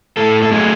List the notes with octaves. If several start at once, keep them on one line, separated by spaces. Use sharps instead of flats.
A2 A4
A4
F#3 A3 G#4